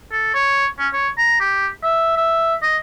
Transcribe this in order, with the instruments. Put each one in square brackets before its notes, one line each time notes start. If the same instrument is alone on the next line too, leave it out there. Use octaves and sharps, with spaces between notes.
[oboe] A4
C#5
C#4
C#5
A#5
G4
E5
E5
D#5